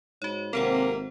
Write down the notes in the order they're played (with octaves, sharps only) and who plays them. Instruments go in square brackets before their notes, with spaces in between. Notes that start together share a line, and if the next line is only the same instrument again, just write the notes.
[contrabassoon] G#2 [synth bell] F#4 C#5
[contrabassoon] G#1 [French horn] C3 [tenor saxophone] A#3 [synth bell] A4 C5 F#5